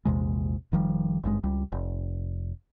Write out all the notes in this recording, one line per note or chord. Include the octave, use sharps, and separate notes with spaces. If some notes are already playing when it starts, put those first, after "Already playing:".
A#1 E2 C3 G#3
F1 D#3 F3 G3
G#1 G2 B2 G#3
C#2 G3
F1